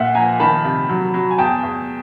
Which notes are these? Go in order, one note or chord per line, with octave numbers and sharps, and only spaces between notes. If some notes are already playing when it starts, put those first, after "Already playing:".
Already playing: A#2 E5 F#5
F3 G#5 A#5
D#3 A5 B5
C3
F#3
F#3
G#5
E2 G5 A5
E2